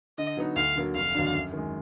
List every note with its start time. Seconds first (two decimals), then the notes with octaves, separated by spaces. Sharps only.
0.18 D3 D#5
0.37 F#3 B3 D#4 F#4
0.56 D2 F5
0.76 D3 F#3 A#3
0.95 F1 F5
1.15 D#2 D3 F#3 D4
1.34 F#2
1.53 D#3 G#3